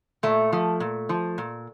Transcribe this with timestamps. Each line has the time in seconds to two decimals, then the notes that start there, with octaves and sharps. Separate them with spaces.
0.23 A#2 A3
0.53 F3
0.80 A#2
1.09 F3
1.38 A#2